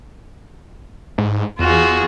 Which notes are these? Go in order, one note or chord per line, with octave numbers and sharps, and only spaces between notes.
G#2
E2 F4 F#4 G#4